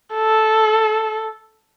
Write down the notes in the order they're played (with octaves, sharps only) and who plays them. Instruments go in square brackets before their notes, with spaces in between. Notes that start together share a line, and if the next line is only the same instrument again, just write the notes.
[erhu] A4